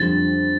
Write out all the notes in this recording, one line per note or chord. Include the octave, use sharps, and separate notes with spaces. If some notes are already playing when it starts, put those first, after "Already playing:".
Already playing: F2 D3 G3 A6